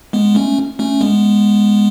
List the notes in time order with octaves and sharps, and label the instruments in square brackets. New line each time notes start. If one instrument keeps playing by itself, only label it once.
[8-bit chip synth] G#3 B3
A3 C#4
A3 C#4
G#3 B3